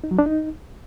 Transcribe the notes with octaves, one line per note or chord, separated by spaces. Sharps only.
D#4
F#3
D4
D#4